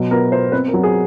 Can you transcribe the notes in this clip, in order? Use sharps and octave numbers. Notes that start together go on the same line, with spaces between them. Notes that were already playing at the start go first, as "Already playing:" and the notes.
Already playing: B2 F#3
B3 A#4
B3 C5
C4 B4
A#4
F#3
G#4